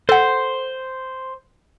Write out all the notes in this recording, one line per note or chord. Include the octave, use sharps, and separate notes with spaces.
A4 C5 F#5